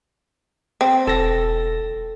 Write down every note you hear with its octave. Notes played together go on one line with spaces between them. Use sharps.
C4
E1 A4 A#6